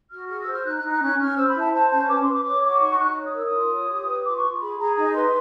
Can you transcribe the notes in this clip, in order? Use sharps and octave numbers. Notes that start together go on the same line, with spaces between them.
F#4 F6
G#4 F6
E6
C5
F6
D#4 F#6
F#6
D#4
F#6
C#4 F#6
C#4 F6
C5 E6
B5
E4
A5
C5 A5
C#4 A5
B4 D6
C6
B4
D6
C#5 D6
F#4 D6
D#4 C#6
D#4 F#6
C#5
D#6
A#4 E6
D#6
F4
C#5
G4
B4
F4 D6
C#6
F4
G#4 B5
G#4 A#5
D#4 A#5
B4 C6